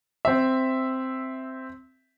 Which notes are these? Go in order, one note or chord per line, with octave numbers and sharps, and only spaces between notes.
C4 E5